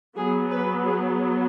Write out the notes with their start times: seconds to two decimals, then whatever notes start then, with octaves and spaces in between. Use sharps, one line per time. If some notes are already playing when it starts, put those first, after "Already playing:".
0.16 F#3 B3 G#4
0.51 B4
0.86 G#4